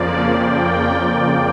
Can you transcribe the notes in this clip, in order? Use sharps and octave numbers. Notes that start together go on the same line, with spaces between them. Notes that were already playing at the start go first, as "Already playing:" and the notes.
Already playing: F2 C#3 F3 A#3 D5
G5